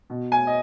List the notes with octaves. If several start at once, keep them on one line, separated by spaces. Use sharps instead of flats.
B2
G#5
D#5